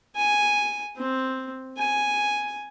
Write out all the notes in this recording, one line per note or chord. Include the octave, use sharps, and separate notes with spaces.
G#5
C4
G#5